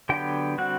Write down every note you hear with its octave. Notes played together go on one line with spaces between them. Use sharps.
D3 F#3 B3 G4 G5
D3 G3 C4 F#4 F#5